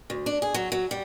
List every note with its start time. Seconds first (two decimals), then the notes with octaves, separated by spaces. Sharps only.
0.10 D2
0.26 D4
0.42 G#4
0.54 F#3
0.72 F#3
0.91 G3